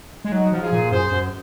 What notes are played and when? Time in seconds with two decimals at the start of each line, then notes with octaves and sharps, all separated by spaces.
0.25 G#3
0.32 F#3 D#4 F#4
0.52 F3
0.61 F4 G#4
0.72 A#2
0.91 F#2 G#4 C5
1.11 F#2